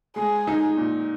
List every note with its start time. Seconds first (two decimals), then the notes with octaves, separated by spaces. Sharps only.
0.16 G#3 G#4
0.47 D#4
0.77 A#2